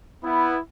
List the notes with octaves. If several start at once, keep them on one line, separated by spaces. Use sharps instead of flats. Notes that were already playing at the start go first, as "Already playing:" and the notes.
B3 E4